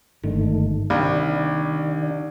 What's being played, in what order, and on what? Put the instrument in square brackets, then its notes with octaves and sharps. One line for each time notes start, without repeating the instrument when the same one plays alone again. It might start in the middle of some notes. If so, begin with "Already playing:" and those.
[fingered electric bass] G1 G#2 D4 [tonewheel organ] D#3 A3
[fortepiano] C2 [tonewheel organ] D#3 D4 [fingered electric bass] A#3